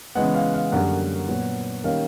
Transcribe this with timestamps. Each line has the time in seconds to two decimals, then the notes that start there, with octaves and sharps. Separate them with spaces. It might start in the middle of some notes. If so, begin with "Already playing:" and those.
0.15 C#3 E3 G#3 B3 F#5
0.34 F5
0.54 F5
0.72 F#2 D3 G3 A#3 C#4 F#5
1.28 A#2 F#3 B3
1.84 D#3 G3 A#3 C#4 F5